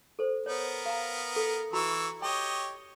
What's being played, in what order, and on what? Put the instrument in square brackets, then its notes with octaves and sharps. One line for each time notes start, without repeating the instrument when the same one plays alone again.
[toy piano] A4 C5
[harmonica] B3 A#4 [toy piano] C#5
[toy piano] F5 A#5
A4
[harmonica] E3 C#6 E6 [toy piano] F#4 A#5 B5
[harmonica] G4 C#5 D#5 [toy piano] G5